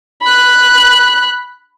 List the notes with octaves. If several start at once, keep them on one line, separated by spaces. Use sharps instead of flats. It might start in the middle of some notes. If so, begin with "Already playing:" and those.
B5 F#6